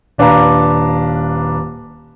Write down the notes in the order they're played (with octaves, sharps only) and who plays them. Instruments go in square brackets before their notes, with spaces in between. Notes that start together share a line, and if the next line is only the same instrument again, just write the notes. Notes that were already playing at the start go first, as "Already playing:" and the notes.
[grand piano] D#1 D4 B4 F5 A#5